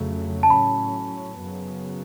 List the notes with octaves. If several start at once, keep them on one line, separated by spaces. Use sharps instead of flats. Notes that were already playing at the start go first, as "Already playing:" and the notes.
Already playing: F2 C#3 F#3 A3
A5
A2 F#3 C#4 B5
F#2 C#3 F#3 B3